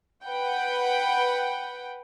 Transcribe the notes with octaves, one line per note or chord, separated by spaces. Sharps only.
B4 F#5 G5